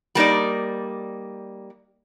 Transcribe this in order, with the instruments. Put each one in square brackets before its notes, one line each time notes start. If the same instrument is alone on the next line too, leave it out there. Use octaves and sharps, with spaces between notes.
[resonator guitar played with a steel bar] G3 A#3 D#4 D5